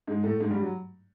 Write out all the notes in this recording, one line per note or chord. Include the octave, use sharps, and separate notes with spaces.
G#2 G#3
A2 A3
G#2 G#3
G2 G3
F#3